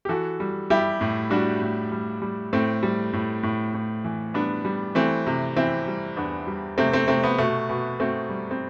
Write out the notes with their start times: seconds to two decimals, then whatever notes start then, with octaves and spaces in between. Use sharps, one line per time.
0.05 G4
0.09 E3 F#4 A4
0.40 G3
0.70 G3 E4 G4
1.01 A2
1.30 G3 D4 F#4
1.62 A2
1.92 G3
2.22 G3
2.53 A2 A3 C4
2.83 G3
3.13 A2
3.43 A2
3.74 A2
4.04 E3
4.34 G3 B3 D4
4.65 G3
4.95 E3 A3 C4
5.27 C3
5.56 E3 C4 E4
5.87 G3
6.17 E2 B3 D4
6.47 G3
6.78 C3 A3 C4
6.93 A3 C4
7.08 C3 A3 C4
7.23 B3
7.38 B2 A3
7.69 B2 B3
8.00 B2 A3 C4
8.29 G3
8.51 C4